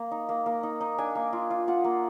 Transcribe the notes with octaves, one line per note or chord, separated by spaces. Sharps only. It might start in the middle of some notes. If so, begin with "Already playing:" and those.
Already playing: A#3
D#4
A#3
A#3
D#4
D#4
D4 G#5
A#3
F4
F4
F4 F#5
A#3